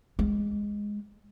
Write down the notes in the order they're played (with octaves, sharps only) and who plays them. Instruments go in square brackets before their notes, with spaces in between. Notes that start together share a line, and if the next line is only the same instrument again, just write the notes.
[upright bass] G#3